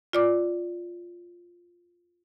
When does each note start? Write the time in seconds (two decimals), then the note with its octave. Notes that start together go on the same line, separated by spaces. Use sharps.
0.13 F4 D5 D6